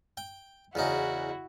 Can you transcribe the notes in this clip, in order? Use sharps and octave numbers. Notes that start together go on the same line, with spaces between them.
G5
E2 C#3 D#4 E4 F#4